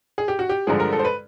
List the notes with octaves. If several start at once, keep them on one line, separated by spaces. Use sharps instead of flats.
G#4
G4
F#4
G4
G2 D3 F3 G#3 G#4
A#4
A4
C5
B4